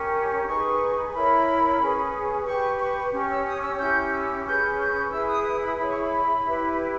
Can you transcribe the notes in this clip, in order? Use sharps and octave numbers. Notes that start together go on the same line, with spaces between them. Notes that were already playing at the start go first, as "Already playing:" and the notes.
Already playing: C#4 G4 A#4
D#4 G#4 B4 C#6
E4 A#4 C#5 B5
C#4 G#4 B4
G4 B4 C#6
C#6
C#4 G4 C#5
E6
D#6
E6
C#4 E4 G4 G6
E6
C#4 G#4 B4 G6
G6
E4 G#4 B4 E6
D#6
D#6
B5
E4 G#4 C#5 B5
C#6
B5
E4 G4 B4